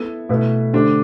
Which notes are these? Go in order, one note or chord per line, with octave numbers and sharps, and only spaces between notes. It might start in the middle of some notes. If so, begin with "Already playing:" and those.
Already playing: B3 E4 A4 E5
B2 A3 E4 B4
D3 A3 D4 G4 C5